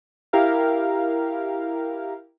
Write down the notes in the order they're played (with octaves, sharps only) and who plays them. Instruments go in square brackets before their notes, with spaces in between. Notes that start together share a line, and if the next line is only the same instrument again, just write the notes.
[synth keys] E4 G4 A#4 F5